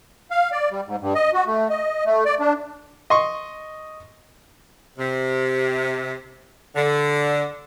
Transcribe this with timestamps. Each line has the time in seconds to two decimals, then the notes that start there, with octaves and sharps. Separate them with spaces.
0.31 F5
0.52 D5
0.71 G3
0.87 G#2
1.02 G2
1.15 D#5
1.34 F#4
1.47 A3
1.70 D#5
2.06 A3
2.25 D5
2.40 D4
3.10 D#5 C6 C#6
4.98 C3
6.76 D3